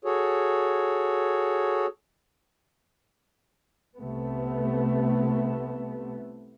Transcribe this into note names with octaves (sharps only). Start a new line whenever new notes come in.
F#4 G#4 A4 C#5
C2 C3 A3 B3